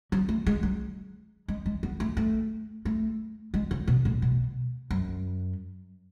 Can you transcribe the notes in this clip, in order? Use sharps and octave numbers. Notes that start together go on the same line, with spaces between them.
F#3
A3
G#3
F#3
G#3
G#3
B3
A3
A3
A3
G#3
C#3
B2
A2
B2
F#2